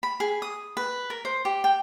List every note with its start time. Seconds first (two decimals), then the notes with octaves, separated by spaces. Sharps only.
0.03 B5
0.20 G#4
0.42 D#6
0.77 B4
1.10 A#4
1.25 C5
1.45 G4
1.64 G5